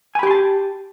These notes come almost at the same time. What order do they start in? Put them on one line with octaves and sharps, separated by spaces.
G#5 B5 G4 C6 A5